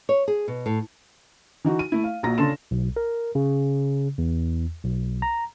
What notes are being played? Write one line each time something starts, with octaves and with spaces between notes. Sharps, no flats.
C#5
G#4
B2
A2
E3 D#4 F#4
D#7
A3 E4
F5
A#1 F#4 A#5 A#6
C#3 D4 A4 C6 E7
B1
A#4
C#3
E2
B1
A#5